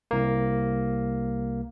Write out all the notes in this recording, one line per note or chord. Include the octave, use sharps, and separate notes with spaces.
C2 A#3